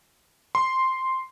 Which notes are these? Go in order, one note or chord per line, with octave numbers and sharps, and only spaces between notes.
C6